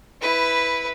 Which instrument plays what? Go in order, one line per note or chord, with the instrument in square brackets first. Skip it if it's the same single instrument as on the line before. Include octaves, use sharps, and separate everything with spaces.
[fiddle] E4 B4